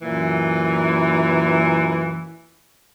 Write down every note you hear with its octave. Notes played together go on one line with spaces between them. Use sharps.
F#2 A#2 E3